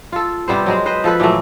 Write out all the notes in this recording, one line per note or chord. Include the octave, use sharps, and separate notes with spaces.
F4 A4
C3 G3 B3 C5
F#3 G#3 C4
B4 C5 D#5
F3 A4 B4
A#2 E3 F#3 A3